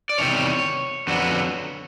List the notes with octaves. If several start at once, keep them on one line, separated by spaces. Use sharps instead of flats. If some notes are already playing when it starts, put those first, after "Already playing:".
D5
E2 C3 D#3 G3 C#5
F2 D3 F#3 B3